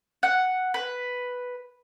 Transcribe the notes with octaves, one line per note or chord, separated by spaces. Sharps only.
F#5
B4